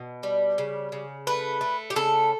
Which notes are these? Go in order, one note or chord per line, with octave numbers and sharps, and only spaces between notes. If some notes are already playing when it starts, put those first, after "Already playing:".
Already playing: B2
G3
C#3
C#3
A3 B4
A3
G4
C#3 A4